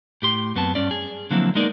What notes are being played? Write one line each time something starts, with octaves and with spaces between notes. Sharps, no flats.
A2 G4 C6
F#2 B3 C4 A5
G2 C#4 D5
G#4
D3 F3 F#3 A#3 C4 E4
G#3 A#3 B3 D#4 A#4 D5